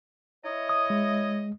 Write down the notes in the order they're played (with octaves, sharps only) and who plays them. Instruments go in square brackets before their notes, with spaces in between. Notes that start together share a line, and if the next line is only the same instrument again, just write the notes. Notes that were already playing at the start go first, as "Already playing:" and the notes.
[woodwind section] E4 C#5 D#5
[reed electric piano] D#6
G#3